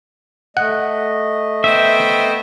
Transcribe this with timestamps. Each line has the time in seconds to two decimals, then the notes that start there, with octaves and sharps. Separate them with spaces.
0.57 A3 D#5 F#5
1.64 B3 C5 E5 G5